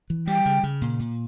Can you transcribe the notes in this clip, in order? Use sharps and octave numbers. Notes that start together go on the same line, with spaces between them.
E3
G3 G5
C#3
C#3
A#2
A#2